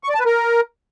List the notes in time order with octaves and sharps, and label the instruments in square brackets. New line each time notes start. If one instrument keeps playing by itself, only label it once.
[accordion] C#6
D5
A5
B4
A#4